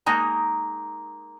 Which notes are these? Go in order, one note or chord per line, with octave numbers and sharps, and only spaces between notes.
G#3 A#3 D#4 G#5 A#5